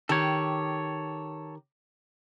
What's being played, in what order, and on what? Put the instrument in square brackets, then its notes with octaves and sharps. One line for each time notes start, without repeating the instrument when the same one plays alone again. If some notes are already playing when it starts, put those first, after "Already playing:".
[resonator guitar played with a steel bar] D#3 G4 [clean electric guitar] A4 C#5